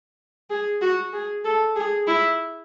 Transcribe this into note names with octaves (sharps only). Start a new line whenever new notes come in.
G#4
F#4
G#4
A4
G#4
E4